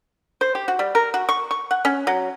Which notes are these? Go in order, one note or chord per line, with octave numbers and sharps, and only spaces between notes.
C5
G4
F#4
G3
A#4
F#4
C#6
C#6
F#5
C#4
F#3